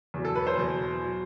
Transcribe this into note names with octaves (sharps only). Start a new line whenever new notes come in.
E2 B2 F#3
A4
B4
C5
E2 B2 F#3
F#3